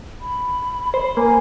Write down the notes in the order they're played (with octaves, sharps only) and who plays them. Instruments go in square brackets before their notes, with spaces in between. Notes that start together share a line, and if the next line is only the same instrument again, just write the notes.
[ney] B5
[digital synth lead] C5
[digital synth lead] A#3 [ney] G#5